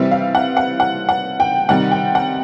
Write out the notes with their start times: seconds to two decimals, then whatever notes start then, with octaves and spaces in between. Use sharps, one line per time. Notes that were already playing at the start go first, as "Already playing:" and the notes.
Already playing: C3 E3 G3 C4 E5
0.11 F5
0.35 F#5
0.57 F#5
0.80 F#5
1.09 F#5
1.40 G5
1.69 C3 D#3 G3 F#5
1.91 G5
2.15 F#5